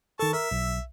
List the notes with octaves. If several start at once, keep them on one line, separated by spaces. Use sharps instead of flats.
D#3 A4 A5 C#6
A#4 E5
B1